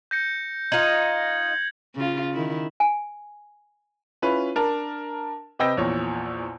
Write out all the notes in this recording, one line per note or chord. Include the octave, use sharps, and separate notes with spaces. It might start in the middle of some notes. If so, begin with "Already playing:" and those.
G6 A#6 C#7
D#4 F4 G#6 F#7
C#3 F4
D#3 E4
G#5
C#4 E4 F4 B4
D4 A#4 A5
C3 B4 D#5 G5 E6 A#6
A#1 E2 A#2 C#5